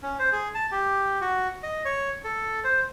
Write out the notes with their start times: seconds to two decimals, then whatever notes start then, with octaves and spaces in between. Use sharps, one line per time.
0.03 C#4
0.19 C5
0.32 G#4
0.55 A5
0.72 G4
1.21 F#4
1.63 D#5
1.85 C#5
2.24 A4
2.64 C5